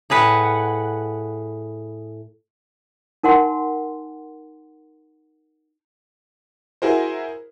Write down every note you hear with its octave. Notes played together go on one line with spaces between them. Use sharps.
A2 G#4 B4 F#5
D#4 A#4 F#5 G#5 C6
E4 F#4 G#4 A#4 C5